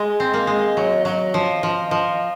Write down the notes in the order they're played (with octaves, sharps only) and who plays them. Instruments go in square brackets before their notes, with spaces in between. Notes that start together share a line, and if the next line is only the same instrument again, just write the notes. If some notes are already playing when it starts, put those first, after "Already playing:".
Already playing: [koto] G#3 [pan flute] D#5
[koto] C4
A#3
G#3
F#3
[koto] F#3 [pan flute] D#5
[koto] F3
F3
F3